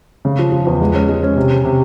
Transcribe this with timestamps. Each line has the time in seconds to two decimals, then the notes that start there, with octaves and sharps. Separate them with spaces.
0.25 C#3
0.39 F3
0.52 F3
0.67 E2
0.81 G#3
0.95 C#4
1.09 G#3
1.23 C#4
1.36 C3
1.51 C3
1.65 C3